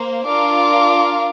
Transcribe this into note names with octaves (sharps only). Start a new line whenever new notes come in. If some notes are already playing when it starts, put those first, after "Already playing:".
Already playing: A#3 C5
D4 F4 A#4 F5 D6